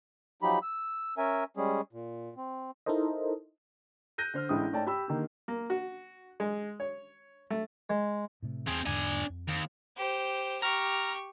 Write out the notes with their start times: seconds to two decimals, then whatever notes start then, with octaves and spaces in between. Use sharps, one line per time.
0.42 F3 F#3 D#4 G4 B5
0.62 E6
1.18 C#4 A#4 E5 G#5
1.57 G3 G#3 C#4 G#4
1.93 A#2
2.37 C4
2.86 D#4 E4 A4 A#4 C5 D#5
4.18 F#6 G6 A#6 D#7
4.34 D3 C5 F6
4.49 A1 G#3 D4 E4 G5 D#6
4.72 G#2 A3 C#5 D5 G5 A5
4.87 G4 B5 E6
5.08 D3 D#3 A#3 G4
5.48 A#3
5.70 F#4
6.40 G#3
6.80 C#5
7.50 A3
7.90 G#3
8.42 A2 C3 A3
8.68 E2 C4 G#4
8.86 E2 G#2 D3 D4 G#5
9.29 F2
9.48 D#2
9.97 G4 C5
10.62 G4 A#5 C#6 F6